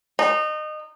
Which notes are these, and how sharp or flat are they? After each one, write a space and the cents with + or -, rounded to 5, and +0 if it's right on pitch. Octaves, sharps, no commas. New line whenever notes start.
D#4 -25